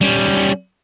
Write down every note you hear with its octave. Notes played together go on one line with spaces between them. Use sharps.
G3 C#4